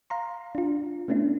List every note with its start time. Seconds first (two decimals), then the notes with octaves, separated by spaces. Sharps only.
0.10 F5 A#5 C6
0.55 D4 F4
1.08 A3 B3 C#4 D4 E4